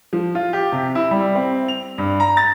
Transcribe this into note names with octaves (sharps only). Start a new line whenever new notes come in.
F3
F4
G4
C3
E4
G3
C4
F7
G2
A#5
A6